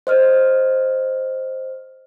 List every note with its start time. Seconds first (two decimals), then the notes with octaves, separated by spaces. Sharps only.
0.07 C5 D#5 F6